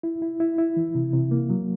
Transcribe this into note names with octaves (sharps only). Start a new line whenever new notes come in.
E4
E4
E4
E4
E3
C3
C3
A#3
F#3